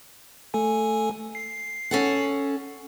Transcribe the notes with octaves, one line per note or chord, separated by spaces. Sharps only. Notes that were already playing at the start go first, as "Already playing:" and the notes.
A3 A4 G#5
C7
C#4 A4 F#5